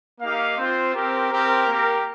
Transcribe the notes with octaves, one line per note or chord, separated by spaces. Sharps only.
A#3 D#4 G4 F5
C4 F4 C5
C4 G4 A#4
C4 G4 A#4
A#3 G4